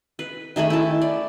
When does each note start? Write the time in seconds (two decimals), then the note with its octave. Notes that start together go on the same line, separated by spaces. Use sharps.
0.19 B4
0.56 D#3 A3 G#4 B5
0.70 E4 A5
1.02 D5